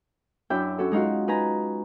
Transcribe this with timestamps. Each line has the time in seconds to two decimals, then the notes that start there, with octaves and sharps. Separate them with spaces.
0.50 F#2 D4 E4 E5 G5 G6
0.78 C#4 F#4 A4
0.91 G#3 D#4 F4 F#4
1.28 D#4 B4 G#5 A#5